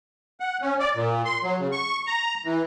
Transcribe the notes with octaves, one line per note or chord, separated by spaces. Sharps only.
F#5
C#4
D5
A#2
C6
F#3
C#3
C#6
A#5
E3